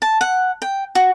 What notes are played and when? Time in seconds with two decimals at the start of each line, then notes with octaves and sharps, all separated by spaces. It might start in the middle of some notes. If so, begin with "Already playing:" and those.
0.02 A5
0.21 F#5
0.62 G5
0.95 F#4